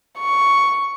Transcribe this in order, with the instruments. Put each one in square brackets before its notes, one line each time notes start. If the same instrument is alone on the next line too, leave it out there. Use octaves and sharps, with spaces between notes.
[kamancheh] C#6